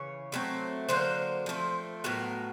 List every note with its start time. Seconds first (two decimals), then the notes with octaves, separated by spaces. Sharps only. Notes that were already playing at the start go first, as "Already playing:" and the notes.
Already playing: C#3 E3 C#5
0.32 D3 F#3 A3 C4
0.89 D3 F#3 A#3 C5
1.46 F3 A3 C4
2.04 A2 F#3 B3 A#4